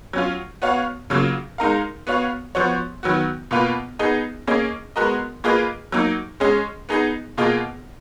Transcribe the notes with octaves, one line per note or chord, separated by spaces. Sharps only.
F#3 C#4 F4
B3 F#4 C#5 F5
C#3 F#3 A#3 F4
G#3 D#4 A#4 F5
B3 F#4 C#5 F5
F3 B3 F#4 C#5
D#3 F#3 B3 F#4
B2 A#3 F4 B4
B3 D#4 G#4 D#5
A#3 C#4 G#4 D#5
G#3 B3 F#4 A#4 D#5
A#3 F4 G#4 B4 D#5
F#3 A#3 D#4
G#3 C#4 G#4 D#5
B3 D#4 G#4 D#5
B2 A#3 F4 G#4 D#5